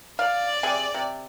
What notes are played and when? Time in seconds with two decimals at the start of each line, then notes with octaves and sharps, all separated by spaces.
0.19 D5 F5
0.63 C3 G#4
0.94 C3